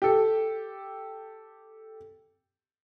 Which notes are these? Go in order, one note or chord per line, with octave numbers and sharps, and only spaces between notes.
G4 A4